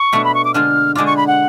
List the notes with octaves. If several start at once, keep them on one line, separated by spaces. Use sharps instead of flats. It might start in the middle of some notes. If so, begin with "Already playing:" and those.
Already playing: C#6
B2 A3 D4
B5
C#6
D6
D3 G#3 D4 F4 F6
D3 G#3 D4 F4 D6
C#6
B5
F#5